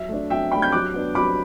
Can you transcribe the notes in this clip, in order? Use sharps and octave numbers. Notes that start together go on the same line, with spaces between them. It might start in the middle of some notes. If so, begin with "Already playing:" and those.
Already playing: F#3 E5
A3 D4
F#3 E5 G5
A3 D4 G5 B5
G6
F#3 D6 F#6
B3 D4
F#3 B5 D6